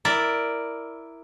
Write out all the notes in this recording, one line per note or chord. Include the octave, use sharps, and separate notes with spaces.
E4 A#4 D5